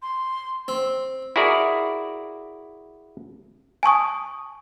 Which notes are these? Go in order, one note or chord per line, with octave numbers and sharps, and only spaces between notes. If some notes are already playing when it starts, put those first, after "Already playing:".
C6
C4
E4 F#4 G#4 A#4 D5
G#5 A5 C#6 D#6